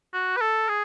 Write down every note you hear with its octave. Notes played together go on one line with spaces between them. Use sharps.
F#4
B4
A4
G#4